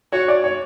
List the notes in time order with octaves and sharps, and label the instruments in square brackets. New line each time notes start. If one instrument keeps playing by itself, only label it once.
[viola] F#4 [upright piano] C#5
[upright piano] D5
C#5